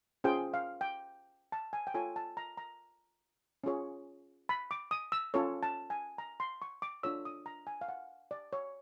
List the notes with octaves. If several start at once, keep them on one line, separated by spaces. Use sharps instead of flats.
C#4 F4 G#4 C5 G5
F5
G5
A5
G#5
G5
F4 A4 C#5 G#5
A5
A#5
A#5
C#4 F4 G#4 C#5
B5
D6
D#6
E6
C#4 F4 A4 C#5
A5
G#5
A#5
C6
C#6
D6
D4 F4 A4 C#5 E6
D#6
A#5
G#5
F5
F#5
D5
C#5